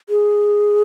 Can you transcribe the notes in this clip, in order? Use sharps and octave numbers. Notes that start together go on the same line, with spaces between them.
G#4